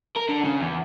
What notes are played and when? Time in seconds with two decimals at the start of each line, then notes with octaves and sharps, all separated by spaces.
0.17 A#4
0.29 D3
0.44 C#3
0.61 E2